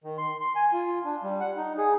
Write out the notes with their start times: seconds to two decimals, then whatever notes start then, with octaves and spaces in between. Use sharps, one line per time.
0.04 D#3
0.18 C6
0.41 C6
0.56 G#5
0.73 F4
1.04 D4
1.23 G3
1.40 F#5
1.57 D#4
1.78 G#4